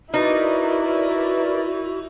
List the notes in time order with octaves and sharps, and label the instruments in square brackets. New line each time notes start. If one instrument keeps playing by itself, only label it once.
[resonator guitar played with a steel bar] D#4 [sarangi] E4 [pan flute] F#4 [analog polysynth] A#4 B4 D5